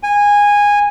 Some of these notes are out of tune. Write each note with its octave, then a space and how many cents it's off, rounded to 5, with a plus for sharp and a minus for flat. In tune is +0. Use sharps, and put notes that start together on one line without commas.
G#5 -15